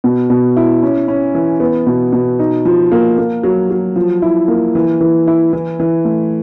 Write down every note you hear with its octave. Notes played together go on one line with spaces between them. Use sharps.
B2
B2
E4
C#4
C#4
E3
B3
B2
B2
D#4
F3
A#3
A#3
F#3
F#3
F3
E4
A#3
E3
E3
E4
E3
E3
A3